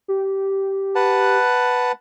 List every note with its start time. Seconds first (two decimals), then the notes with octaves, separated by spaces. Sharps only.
0.08 G4
0.95 B4 F#5 A5